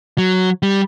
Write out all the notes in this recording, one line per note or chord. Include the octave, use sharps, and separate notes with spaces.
F#3
G3